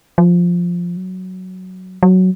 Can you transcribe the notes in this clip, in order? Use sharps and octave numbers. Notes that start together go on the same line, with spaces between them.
F3
F#3
F#3